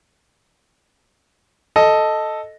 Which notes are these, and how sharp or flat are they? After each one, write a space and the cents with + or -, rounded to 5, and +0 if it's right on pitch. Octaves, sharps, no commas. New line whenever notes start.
A4 +0 D#5 +0